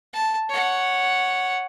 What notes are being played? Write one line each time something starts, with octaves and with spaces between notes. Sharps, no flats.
A5
C#5 F#5